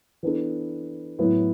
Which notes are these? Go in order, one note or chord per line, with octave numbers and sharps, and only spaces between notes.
E3 B3 D4 A4
A2 F#3 B3 E4